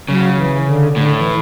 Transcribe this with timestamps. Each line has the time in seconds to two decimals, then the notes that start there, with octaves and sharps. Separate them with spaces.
0.09 C#3 F#3
0.38 E3
0.67 D3
0.96 A2 D3
1.18 E3